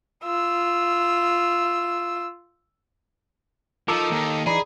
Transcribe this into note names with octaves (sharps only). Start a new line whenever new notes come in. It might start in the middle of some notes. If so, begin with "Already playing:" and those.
F4 E6
F3 D#4 A4 A#4 D6 E6
D#2 D#3
E3 D#4 G#4 D5 A#5 B5